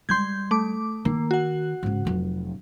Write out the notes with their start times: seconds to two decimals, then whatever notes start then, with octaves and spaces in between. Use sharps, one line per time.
0.09 G3 G#3 C6 G6 G#6
0.51 A3 D6
1.05 D#3 A#3 D#4
1.31 F#4 F#5
1.83 G#2 C#3
2.05 F1 F#3